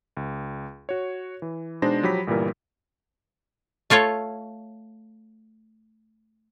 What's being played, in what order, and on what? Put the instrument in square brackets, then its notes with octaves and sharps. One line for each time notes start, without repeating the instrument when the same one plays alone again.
[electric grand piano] C#2
F#4 C#5
E3
B2 G#3 D4 D#4 C5 A#6
F3 F#3 G4 B5 B6
G1 A#2 E3 G3 A#4
[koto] A3 F4 A4 C#5